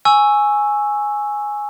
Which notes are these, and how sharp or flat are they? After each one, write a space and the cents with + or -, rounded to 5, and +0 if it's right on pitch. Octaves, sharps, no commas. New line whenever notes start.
G#5 +0 C#6 +0 E6 +0